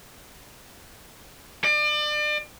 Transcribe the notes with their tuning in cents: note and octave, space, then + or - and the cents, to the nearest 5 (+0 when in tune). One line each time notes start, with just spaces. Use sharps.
D5 +35